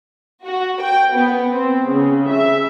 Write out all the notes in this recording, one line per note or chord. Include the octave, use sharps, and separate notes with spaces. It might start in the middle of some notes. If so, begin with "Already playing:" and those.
F#4
G5
B3
C4
C#3
E5